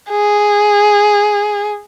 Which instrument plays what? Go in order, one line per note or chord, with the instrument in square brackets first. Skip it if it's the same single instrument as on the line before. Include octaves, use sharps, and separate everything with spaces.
[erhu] G#4